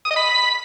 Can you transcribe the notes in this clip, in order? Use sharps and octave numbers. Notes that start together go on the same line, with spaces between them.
D#6
D#5
B5